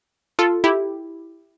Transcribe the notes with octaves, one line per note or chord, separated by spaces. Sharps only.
F4 A4
E4 G4